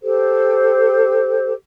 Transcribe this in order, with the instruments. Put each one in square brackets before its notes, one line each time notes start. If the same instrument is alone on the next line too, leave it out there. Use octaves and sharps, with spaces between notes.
[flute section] G4 A4 C5